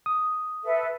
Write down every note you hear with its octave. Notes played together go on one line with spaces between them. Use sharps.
D#6
A4 B4 E5